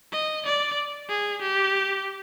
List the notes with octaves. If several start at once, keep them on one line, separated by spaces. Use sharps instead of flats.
D#5
D5
G#4
G4